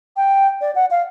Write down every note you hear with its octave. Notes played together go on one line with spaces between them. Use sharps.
G5
D5
F#5
F5